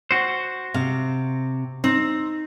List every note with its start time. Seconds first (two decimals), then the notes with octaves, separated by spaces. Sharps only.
0.11 F#4 C5
0.74 C3 F5
1.84 C4 D#4